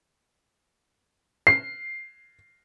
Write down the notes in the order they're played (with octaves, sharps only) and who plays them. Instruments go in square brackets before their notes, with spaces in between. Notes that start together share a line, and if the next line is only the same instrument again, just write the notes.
[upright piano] C7